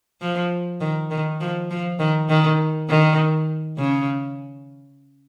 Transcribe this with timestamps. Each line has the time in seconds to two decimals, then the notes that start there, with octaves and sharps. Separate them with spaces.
0.21 F3
0.81 D#3
1.11 D#3
1.41 F3
1.71 F3
1.99 D#3
2.29 D#3
2.89 D#3
3.78 C#3